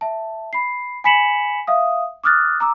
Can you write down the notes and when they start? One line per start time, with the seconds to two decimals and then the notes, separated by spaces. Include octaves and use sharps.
0.01 E5 A5
0.53 B5 C7
1.04 G#5 B5 B6 C#7 E7 F#7
1.67 E5 F5 D#6
2.24 D6 D#6 F6 F#6 A6
2.60 A#5 D6 E6